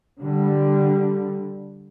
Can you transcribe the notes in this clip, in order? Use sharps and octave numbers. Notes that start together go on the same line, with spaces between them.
D3 G3